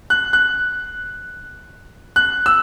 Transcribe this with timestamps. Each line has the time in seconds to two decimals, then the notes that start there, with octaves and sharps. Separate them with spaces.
0.10 F#6
0.33 F#6
2.16 F#6
2.46 E6